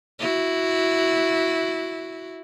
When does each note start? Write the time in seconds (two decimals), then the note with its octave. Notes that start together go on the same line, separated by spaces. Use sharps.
0.19 E4 F#4